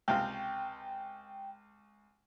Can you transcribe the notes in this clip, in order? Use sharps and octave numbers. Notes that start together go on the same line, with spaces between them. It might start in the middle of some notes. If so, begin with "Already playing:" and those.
C#2 C3 F5 G5